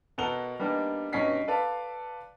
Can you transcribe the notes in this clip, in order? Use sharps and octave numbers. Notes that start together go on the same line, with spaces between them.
B2 A4 A#4 F#5 F7 G7
G3 A#3 B3 D4 D#4
G2 B2 C#4 D#4 B6 C7
A4 B4 D5 F5 A5